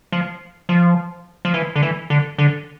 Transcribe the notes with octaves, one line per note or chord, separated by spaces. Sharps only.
F3
F3
F3
E3
D3
E3
D3
D3